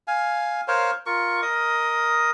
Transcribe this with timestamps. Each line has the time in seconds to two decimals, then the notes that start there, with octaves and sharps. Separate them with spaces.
0.08 F5 G#5
0.68 A#4 C5 C#5 F5
1.06 F4 A#4 C#6
1.42 A#4 D#5 D#6